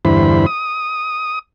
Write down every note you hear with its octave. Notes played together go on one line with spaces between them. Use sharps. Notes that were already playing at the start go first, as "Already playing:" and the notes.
E2 G2 D3 E4 C5 B5
D#6